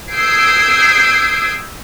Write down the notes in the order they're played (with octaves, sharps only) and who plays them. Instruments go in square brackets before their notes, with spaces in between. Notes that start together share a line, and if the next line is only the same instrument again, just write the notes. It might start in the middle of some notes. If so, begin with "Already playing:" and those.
[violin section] D#6 E6 G6 G#6 C7 D7